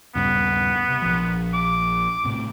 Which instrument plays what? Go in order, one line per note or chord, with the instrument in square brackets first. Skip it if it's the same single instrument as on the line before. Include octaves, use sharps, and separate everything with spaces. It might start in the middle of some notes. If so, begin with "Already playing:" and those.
[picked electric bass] D#1 G2 C#3 [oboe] B3
[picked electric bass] C3
A#1 F3
[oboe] D6
[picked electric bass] A2 C3